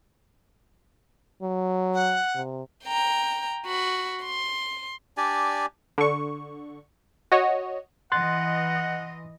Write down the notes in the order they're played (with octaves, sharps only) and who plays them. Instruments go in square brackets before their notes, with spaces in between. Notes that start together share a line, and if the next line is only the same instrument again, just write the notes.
[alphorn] F#3
[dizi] F#5
[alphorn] C3
[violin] G5 A#5
F#4 B5
C6
[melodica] D4 G4 D5 G#5
[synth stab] D3 C#6
F#4 C#5 D#5
[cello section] E3 D#5 [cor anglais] F#5 [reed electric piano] C6 F#6 A6